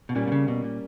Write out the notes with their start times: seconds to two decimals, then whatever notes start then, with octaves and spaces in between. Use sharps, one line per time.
0.09 B2
0.15 A#2 G3 A#3 C#4
0.28 B2
0.32 C#3
0.48 B2
0.64 A#2